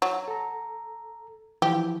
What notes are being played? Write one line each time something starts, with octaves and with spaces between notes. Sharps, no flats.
F#3
A4 A#5
E3 F3 G4